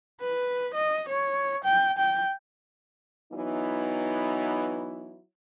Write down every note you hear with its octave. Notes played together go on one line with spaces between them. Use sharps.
B4
D#5
C#5
G5
G5
E3 F#3 B3 D#4 E4